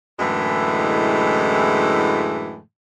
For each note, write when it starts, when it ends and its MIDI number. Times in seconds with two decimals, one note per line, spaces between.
0.19 2.59 42
0.19 2.59 45
0.19 2.59 50
0.19 2.59 52
0.19 2.59 56